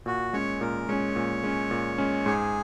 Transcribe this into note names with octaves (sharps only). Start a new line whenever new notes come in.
A#2 F#4
G#3 C#4 C#5
A#2 A#4
G#3 C#4 C#5
A#2
G#3 C#4
A#2
G#3 C#4
G#2 G#4